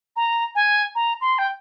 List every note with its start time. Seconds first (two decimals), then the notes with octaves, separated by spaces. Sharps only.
0.16 A#5
0.55 G#5
0.95 A#5
1.21 C6
1.38 G5